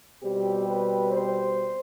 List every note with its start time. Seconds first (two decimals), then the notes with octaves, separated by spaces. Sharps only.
0.21 B2 G3 C4 G4
0.67 B4
1.12 C5